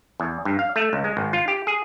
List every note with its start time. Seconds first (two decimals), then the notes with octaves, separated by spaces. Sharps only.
0.20 E2
0.45 G2
0.59 F5
0.76 A3
0.93 C#2
1.04 G#3
1.17 G#1
1.33 F4
1.48 G4
1.67 G#4